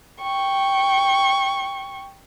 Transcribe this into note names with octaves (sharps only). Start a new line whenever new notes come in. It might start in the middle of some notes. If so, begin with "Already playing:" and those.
G5 C#6